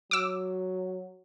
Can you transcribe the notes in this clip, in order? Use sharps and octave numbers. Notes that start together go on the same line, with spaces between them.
F#3 D6 E6